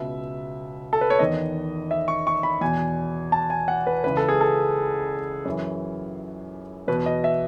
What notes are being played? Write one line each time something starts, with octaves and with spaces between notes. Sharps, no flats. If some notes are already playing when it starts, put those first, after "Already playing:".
Already playing: C#2 B2 E5
A4
B4
C#5
E2 D#3 D#5
E5
C#6
C#6
B5
E2 B2 G#5
A5
G#5
F#5
B4
C#2 C#3 E3 B4
A4
G#4
A4
F#2 E3
E2 B2 B4
D#5
E5